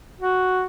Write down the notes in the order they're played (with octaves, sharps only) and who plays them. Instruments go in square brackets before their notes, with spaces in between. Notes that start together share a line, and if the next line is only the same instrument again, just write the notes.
[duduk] F#4